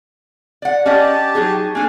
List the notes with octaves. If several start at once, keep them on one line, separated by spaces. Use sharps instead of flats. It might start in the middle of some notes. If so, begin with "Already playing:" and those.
D5 F#5
C#4 G4 D5 D#5 A5
F#3 D#4 G#4
A#3 D4 A4 G#5